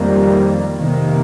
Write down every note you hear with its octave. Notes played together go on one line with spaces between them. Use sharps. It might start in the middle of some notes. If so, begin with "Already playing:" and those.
Already playing: F2 D#3 G3 A#3
F2 C3 D#3 A#3